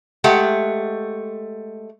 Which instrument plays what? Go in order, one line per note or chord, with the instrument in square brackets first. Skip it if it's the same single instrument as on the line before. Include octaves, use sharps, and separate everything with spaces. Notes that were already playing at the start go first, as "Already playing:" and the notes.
[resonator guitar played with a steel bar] G#3 A3 G4 F#5